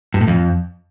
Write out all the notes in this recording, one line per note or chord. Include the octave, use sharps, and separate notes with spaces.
G2
A2
F2